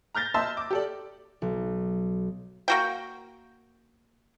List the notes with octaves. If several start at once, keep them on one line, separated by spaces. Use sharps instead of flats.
A#5 F6 G6 A6 A#6
D#5 E5 A5 C6 E6
D6
G4 A4 D5
B1
A#3 F#4 G5